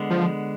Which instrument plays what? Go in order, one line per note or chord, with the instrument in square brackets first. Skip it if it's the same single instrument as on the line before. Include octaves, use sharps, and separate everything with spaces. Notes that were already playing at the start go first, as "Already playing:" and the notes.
Already playing: [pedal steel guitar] D3 G#3 B3
[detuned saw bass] F3